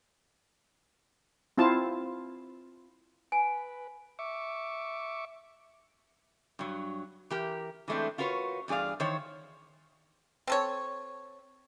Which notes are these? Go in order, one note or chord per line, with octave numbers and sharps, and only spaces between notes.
C4 E4 F4 A5
B4 G#5
E5 C#6 D6
G2 F#3
E3 G4 A#4
E3 G#3 A3 C4 D4
F4 F#4 A#4 B4 C#5
E2 G2 G#4 D5 F5
D#3 E3 C5 C#5
C4 A4 C#5